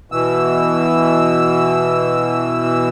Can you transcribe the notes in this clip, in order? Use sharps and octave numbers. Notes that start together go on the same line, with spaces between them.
B2 E3 E6